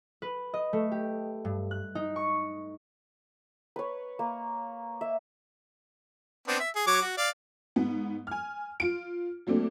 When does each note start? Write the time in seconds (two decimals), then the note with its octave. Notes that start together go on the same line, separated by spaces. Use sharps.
0.22 B4
0.54 D#5
0.73 A3
0.92 G4
1.45 G2
1.71 F#6
1.95 D#4
2.16 C#6
3.76 B4 C#5
4.19 A#3
5.01 E5
6.48 B3 C4 D4
6.60 E5
6.76 G#4
6.87 F#3 C#5 D6
7.02 F#4
7.18 D5 F5
7.76 G#2 B3
8.27 G#5 F6
8.80 F4 D7
9.47 F#3 A3 A#3 C4 D4